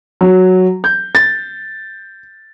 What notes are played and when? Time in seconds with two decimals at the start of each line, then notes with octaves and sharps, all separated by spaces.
0.21 F#3
0.84 G6
1.15 A6